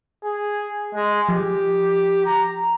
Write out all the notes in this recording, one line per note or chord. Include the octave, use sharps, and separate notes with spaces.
G#4
G#3
F3 G4
A#5